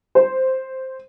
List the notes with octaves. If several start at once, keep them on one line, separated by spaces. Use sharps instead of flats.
C5